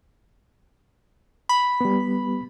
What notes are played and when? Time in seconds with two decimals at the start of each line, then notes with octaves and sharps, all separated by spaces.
1.49 B5
1.81 G3 B3